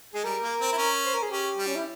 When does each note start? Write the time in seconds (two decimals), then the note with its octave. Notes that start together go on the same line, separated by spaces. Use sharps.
0.14 G#3 G#4
0.24 G3 A#4
0.42 A#3
0.60 C4
0.72 E4
0.78 C#4
1.06 C5
1.14 A#4
1.22 G#4
1.31 C#4 G4
1.58 G3
1.67 C#4
1.76 E4